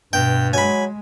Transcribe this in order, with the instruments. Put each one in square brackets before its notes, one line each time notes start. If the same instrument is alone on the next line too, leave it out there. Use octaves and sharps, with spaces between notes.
[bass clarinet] G2 [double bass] B2 [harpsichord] G5
[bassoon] F#3 [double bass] G#3 [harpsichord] G#5 B5